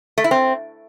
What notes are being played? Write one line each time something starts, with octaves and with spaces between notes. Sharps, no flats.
A3
E4
C4